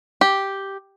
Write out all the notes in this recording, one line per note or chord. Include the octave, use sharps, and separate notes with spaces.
G4